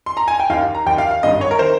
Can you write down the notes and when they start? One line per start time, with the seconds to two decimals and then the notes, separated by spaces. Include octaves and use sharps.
0.06 C6
0.17 A#5
0.28 G#5
0.40 G5
0.50 D#2 D#3 F5
0.75 A#5
0.86 D#2 D#3 G5
0.98 F5
1.11 F5
1.23 G#1 G2 D#3 D#5
1.41 C#5
1.51 A#4
1.59 D#3 C5